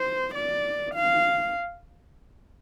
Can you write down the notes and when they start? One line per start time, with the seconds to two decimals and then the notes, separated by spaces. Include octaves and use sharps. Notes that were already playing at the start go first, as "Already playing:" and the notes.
Already playing: C5
0.35 D5
0.95 F5